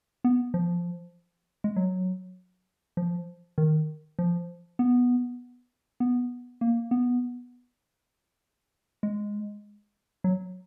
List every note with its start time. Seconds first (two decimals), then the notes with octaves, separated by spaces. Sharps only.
0.24 B3
0.54 F3
1.64 G#3
1.76 F#3
2.97 F3
3.58 D#3
4.19 F3
4.79 B3
6.00 B3
6.61 A#3
6.91 B3
9.03 G#3
10.24 F#3